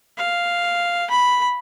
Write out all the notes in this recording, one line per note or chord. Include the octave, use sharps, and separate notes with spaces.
F5
B5